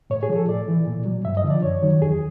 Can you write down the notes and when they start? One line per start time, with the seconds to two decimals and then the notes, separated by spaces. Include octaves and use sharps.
0.10 A2 C#5
0.23 G#4
0.29 F3
0.36 A4
0.48 A2 D5
0.68 E3
0.87 A#2
1.05 F#3
1.25 G2 E5
1.37 D#5
1.44 D3 F3
1.50 D5
1.63 F#2 C#5
1.82 D#3 F#3
2.02 E2 G#4